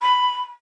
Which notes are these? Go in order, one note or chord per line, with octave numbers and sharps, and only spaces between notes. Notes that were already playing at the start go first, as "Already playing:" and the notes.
B5